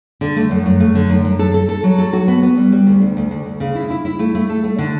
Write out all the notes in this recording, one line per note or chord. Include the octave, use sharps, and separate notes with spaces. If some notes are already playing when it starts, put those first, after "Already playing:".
D3
A3
F#2
F#2
A3
D3
F#2
F#2
A4
A4
A4
F#3
A4
F#4
B3
B3
G3
G3
D2
D2
D2
D2
D2
C#3
E4
E4
E4
A3
A3
A4
A3
D3